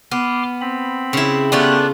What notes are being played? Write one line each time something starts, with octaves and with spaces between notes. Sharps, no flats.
B3 C6 D6 F6
C4 B5
C#3 E4
A3 B3 C#4 D4 F4 G4